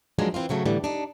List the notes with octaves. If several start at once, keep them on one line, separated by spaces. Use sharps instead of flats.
F3 F#3 G#3 A#3 D4 D#4
E3 C4 E4 F4
G#2 C#3 F#3 A3
A2 D3 E3 G3
D4 D#4